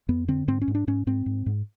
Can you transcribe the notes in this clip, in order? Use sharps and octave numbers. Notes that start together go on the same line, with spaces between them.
F2 B3
D3 C4
G#2 C4
C#4
G#2
D4
G#2 C#4
G#2 C4
G#2
G#2